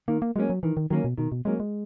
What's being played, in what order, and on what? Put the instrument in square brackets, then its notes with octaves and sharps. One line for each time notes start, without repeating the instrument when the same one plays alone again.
[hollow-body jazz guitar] D#3 [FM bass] A#3
[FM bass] A#3
[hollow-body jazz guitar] F#3 A#3 C#4 [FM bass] G#3
[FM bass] F#3
[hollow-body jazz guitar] D#3 [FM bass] E3
[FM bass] D#3
[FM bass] D#3 [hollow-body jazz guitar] F#3 A#3 C#4
[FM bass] B2
[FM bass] B2 [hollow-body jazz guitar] D#3
[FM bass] B2
[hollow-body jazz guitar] F#3 A#3 C#4 [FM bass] G#3
[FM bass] G#3